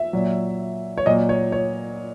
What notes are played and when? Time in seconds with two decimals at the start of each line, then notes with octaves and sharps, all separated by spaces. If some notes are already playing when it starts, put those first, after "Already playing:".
Already playing: E5
0.13 A#2 F#3
0.98 C#5
1.06 A#2 F#3 D#5
1.29 C#5
1.52 C#5